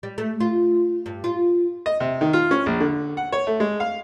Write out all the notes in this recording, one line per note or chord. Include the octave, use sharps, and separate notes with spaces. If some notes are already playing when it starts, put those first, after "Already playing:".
G3
A3
F4
G2
F4
D#5
C3
D#3
F4
C#4
A#1
D3
F#5
C#5
A3
G#3
F5